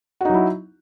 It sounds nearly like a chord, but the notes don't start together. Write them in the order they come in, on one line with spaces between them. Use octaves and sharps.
F#4 D#4 F#3 E4